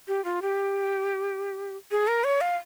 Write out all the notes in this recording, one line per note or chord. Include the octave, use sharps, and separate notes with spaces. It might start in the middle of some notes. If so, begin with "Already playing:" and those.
G4
F4
G4
G#4
A#4
C#5
F5